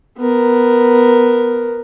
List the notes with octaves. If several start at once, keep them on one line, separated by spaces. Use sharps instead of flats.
B3 A#4